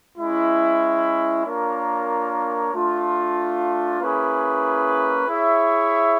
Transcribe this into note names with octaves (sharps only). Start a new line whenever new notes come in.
G#3 C#4 E4
A#3 D4 F4 A#4 C#5
A3 D4 F4
A#3 C#4 E4 G#4 B4
E4 G#4 C#5 E5